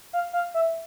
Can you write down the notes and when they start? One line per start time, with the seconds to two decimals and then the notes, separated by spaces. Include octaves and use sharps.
0.13 F5
0.33 F5
0.54 E5